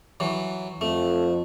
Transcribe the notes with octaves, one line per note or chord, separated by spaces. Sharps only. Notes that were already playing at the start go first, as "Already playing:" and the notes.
E3 F#3
F2 A3